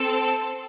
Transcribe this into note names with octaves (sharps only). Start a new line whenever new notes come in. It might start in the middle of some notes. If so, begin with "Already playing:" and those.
Already playing: C4 A4